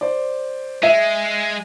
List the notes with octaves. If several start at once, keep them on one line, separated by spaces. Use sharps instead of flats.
C5 D5
G#3 E5